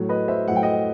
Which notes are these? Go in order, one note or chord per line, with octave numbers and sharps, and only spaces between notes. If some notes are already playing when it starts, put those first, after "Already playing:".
Already playing: A2 F#3
B4 D#5
C5 E5
A2 F#3 F#5
G5
D#5 F#5